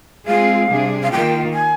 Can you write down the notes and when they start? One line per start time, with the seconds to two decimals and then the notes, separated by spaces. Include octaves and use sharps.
0.27 G#3 C4 F4 G#4 F5
0.69 C3 G3 D4 G#4
1.03 F5
1.12 D#3 A#3 F4 G5
1.54 G#5